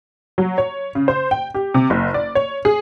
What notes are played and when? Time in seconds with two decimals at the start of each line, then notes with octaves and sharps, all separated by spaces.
0.38 F#3
0.58 C#5
0.95 C#3
1.08 C5
1.31 G5
1.54 G4
1.74 C3
1.90 F#1
2.14 D5
2.35 C#5
2.65 G#4